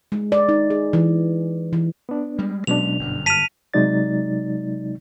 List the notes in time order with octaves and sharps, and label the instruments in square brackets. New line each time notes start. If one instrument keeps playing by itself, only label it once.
[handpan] G#3
D5
D#4
G#4
E3
E3
[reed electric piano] B3 D4
[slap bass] G3 G#3
[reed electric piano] B2 D4 [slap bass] F#3 G#3 C#4 [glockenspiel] F7
[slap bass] G1 F#2
[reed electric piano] A5 F6 [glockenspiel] B6 D#7 F7
[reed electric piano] C3 F#3 G#3 D#4 D5 A6